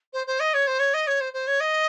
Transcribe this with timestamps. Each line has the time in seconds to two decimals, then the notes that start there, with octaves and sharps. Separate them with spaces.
0.13 C5
0.27 C5
0.40 D#5
0.54 C#5
0.67 C5
0.79 C#5
0.94 D#5
1.07 C#5
1.21 C5
1.33 C5
1.47 C#5
1.60 D#5